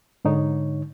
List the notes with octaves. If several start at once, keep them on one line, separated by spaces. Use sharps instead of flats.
G#2 D3 D#4 C#5